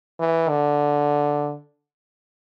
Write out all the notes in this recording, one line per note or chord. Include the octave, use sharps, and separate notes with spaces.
E3
D3